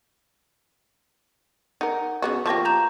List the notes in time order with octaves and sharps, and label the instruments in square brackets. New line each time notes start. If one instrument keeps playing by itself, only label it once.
[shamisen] D#4 A#4 [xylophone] F#5
[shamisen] C#3 B3 F#4
[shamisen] F3 A#3 G4 [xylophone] A5 C#6 A#6
[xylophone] A#5 G6 E7